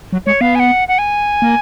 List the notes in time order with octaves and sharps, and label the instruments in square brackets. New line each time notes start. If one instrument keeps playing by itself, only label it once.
[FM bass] F#3
[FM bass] G#3 [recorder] C#5
[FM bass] B3 [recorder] F5
[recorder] G#5
F#5
F#5
G#5
[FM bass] A#3